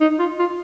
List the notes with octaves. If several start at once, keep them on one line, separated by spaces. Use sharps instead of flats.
D#4
F4
F4